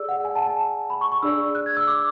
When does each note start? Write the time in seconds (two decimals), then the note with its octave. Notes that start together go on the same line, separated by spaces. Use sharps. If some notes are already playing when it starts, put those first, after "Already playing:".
Already playing: G#4 D5 E6
0.09 F#5
0.25 G#5
0.35 A5
0.46 A5
0.90 B5
1.01 C#6
1.12 C#6
1.22 D4 G#4 D5 E6
1.55 F#6
1.66 G#6
1.77 E6
1.87 D6